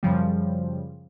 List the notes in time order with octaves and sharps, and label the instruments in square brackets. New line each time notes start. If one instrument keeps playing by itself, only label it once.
[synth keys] F#2 C#3 F3 G3